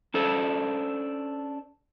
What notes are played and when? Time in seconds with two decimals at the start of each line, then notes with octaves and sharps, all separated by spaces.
0.14 C#4 D4 A4 C5